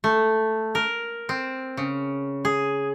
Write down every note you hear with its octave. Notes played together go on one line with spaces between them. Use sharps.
A3
A#4
C4
C#3
G#4